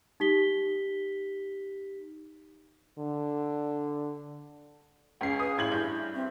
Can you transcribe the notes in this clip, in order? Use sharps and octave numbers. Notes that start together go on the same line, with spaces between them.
D#4 G4 B6 G7
D3
C#2 C#4 G#4 F5 C7
B4 D#6
A1 E4 G#6 F#7
G2 G6
C4 E5